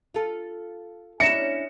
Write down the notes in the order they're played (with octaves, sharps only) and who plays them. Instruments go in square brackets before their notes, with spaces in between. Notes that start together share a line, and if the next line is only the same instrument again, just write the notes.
[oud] F4 A4
[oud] C#4 D4 E4 [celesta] E5 A#6 E7 [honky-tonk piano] C#7